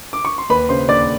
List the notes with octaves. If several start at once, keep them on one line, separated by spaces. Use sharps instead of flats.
D6
C#6
C6
D#2 B4 B5
C#3 C5 C6
D#2 D5 D6